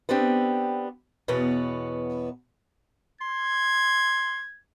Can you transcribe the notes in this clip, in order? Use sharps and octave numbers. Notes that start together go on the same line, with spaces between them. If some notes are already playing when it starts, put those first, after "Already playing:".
B3 C4 D4 G4
E2 B2 B3 B4 C#5
C6 G#6